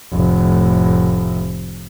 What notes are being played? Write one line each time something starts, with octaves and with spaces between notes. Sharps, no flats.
F1 A2